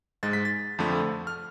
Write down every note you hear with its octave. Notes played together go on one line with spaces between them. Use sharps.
G#2 G#3 A6
B6
A6
F2 D3 F3 A3
F6